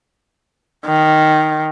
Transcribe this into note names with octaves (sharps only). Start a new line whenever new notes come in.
D#3